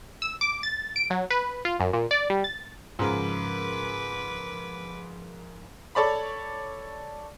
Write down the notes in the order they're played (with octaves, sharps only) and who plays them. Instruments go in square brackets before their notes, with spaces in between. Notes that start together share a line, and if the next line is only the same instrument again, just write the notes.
[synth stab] E6
D6
A6
D7
F#3
B4
F4
F#2
A#2
D5
G3
A6
[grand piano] G#2 C#3 [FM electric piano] F3 A#4 [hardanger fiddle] B4 D6
[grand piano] A4 C#5 D5 B5